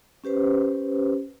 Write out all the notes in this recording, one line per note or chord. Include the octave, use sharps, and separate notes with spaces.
C#4 G4 B4 C5